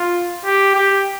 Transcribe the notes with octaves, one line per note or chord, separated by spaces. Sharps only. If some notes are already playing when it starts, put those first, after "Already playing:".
Already playing: F4
G4
G4